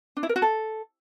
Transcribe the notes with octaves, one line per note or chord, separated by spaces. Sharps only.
D4
E4
A#4
F#4
A4